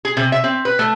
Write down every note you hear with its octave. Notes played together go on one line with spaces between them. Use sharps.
G#4
C3
E5
C4
B4
A3